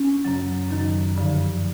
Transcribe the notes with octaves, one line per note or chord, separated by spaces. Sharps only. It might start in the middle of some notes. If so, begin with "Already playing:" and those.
Already playing: C#4
F#2 C#3 F#3
F#2 D#3 F#3 D#4
G2 D3 F3